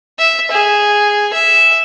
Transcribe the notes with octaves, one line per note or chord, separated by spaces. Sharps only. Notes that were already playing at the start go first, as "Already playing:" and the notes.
E5
G#4
E5